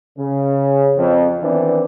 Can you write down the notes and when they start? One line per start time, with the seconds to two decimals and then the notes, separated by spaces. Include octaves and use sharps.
0.18 C#3
0.97 F2
1.42 D#3 E3 B3 C4 D4